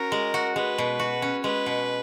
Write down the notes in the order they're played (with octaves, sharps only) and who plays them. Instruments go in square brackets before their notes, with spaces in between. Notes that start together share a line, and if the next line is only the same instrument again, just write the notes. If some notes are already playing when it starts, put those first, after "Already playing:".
Already playing: [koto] C#4 F#4 [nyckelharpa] A#4
[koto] G#3
F#4
[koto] G#3 [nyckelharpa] B4
[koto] B2
F#4
C#4
[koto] G#3 [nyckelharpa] B4
[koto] B2